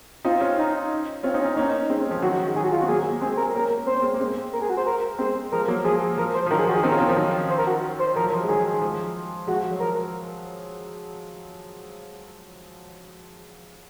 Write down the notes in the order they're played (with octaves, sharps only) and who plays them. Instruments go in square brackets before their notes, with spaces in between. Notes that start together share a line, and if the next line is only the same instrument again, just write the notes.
[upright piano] C4 D#4 [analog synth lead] F4
[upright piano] C#4 F4
[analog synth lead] D#4
[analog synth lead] C4 [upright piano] C#4 F4
[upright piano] C4 D#4
[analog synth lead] C#4
[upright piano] D#4
[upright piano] A#3 C#4 [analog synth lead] D#4
[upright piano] G#3 C4
G#3 C4
F3
[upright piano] D#3 F#3 [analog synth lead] F#4
[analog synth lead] F#4
[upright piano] G#3
[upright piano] D#3 F#3 [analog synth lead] G#4
[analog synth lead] F#4
F4
[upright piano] C4 [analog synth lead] F#4
[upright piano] F#3 A#3 [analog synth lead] G#4
[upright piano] A#3
[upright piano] G#3 C4 [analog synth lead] G#4
[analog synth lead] G#4
A#4
[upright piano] A#3 C#4 [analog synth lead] A#4
[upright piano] C4 [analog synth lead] C5
[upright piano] C#4
G#3 C4
A#3
G#3 C4
[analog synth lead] A#4
G#4
F#4
C5
A#4
[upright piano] G#3 C4 [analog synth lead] C5
[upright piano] F3 G#3 [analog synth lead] A#4
[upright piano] F#3 A#3
[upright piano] F3 G#3 [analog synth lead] G#4
[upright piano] F3 [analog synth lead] A#4
[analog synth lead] C5
[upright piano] F3
[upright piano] D#3 F#3 [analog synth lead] A#4
[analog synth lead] G#4
F#4
G#4
[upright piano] C4 D#4 [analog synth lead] A#4
[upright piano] C#4 F4
C4 D#4
F3
D#3 F#3
[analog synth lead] C5
A#4
F#4
C5
[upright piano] F3 [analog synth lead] A#4
[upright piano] F#3
F3
G#3
[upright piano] D#3 F#3 [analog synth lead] G#4
[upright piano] F3 G#3
[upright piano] F3 G#3 [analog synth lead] F#4
[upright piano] F#3
[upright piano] F3 [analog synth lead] A#4